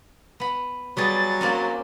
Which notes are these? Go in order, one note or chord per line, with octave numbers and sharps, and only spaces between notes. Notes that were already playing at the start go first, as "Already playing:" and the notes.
B3 B5
F#3 G3 B3 G#4 A6
A#3 C4 C#4